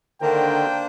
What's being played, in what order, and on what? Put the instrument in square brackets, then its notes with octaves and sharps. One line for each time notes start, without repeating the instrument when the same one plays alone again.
[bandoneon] D3 D#3 [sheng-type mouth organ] A#3 D4 C5 [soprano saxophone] A#4 [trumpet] G5